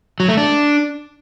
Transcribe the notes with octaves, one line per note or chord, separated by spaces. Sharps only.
F#3
A3
D4